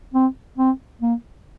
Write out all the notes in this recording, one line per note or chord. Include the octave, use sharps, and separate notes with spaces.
C4
C4
A#3